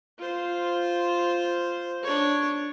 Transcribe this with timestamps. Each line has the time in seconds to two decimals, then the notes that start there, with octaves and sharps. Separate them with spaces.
0.18 F4 C5
2.03 D4 C#5